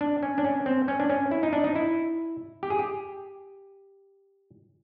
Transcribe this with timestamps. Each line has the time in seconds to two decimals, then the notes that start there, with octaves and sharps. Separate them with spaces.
0.01 D4
0.23 C#4
0.38 D4
0.44 C#4
0.66 C4
0.88 C#4
1.00 D4
1.10 C#4
1.31 E4
1.43 D#4
1.53 D4
1.64 D#4
1.75 E4
2.63 G4
2.70 G#4
2.79 G4